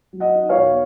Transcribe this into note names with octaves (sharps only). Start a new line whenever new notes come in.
F#3
D#5 F#5
D#4
C#5 F5
B2